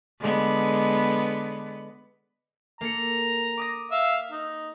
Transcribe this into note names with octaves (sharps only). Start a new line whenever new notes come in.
D3 G#3 B3
A#3 A4 A#5 C#7
D6 D#6 A#6
E5 F5
D#4